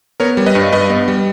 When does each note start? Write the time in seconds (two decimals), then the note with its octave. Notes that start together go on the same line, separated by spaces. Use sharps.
0.20 B3 A#4 C#5
0.37 G3
0.46 B4 D#5
0.55 G2
0.72 G2 B4 D#5
0.90 B3
1.08 G3